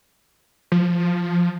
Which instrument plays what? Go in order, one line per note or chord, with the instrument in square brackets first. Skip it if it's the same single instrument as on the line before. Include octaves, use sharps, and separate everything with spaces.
[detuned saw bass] F3